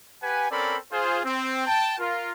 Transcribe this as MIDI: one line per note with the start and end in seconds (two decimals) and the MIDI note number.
0.22 0.48 67
0.22 0.48 71
0.22 0.48 78
0.22 0.48 80
0.52 0.76 60
0.52 0.76 61
0.52 0.76 69
0.52 0.76 70
0.52 0.76 74
0.52 0.76 83
0.93 1.19 65
0.93 1.19 68
0.93 1.19 72
1.25 1.65 60
1.67 1.94 79
1.67 1.94 81
1.99 2.32 65
1.99 2.32 70